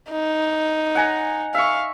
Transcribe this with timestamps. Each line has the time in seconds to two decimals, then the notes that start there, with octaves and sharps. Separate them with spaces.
0.10 D#4
0.95 F#5 G#5 A#5
1.55 E5 F5 C#6